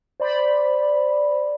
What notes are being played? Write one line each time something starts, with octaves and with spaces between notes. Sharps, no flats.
C5 D5 B5